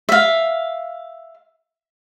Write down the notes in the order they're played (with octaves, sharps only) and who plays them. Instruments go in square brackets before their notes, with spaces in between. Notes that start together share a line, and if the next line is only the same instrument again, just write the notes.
[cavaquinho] E5 F5